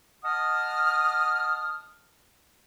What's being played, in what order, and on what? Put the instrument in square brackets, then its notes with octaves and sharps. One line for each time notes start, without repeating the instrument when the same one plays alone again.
[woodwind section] D#5 F#5 A5 D#6 F6